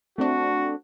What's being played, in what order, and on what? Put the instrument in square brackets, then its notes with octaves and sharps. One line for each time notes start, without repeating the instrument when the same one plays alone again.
[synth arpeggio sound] A3 C4 D4 [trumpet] F#4